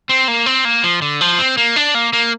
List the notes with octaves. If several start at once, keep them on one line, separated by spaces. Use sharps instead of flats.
C4
A#3
C4
A#3
F3
D3
F3
C4
A#3
D4
A#3
A#3